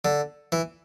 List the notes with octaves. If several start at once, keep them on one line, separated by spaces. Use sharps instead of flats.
D3
E3